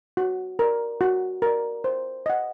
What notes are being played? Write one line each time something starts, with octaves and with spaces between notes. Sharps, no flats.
F#4
A#4 D5
F#4
A#4 D5
C5
D#5 F#5